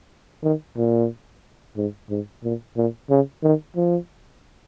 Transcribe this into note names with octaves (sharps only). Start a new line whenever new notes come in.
D#3
A#2
G#2
G#2
A#2
A#2
C#3
D#3
F3